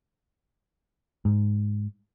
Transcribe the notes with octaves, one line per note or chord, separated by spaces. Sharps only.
G#2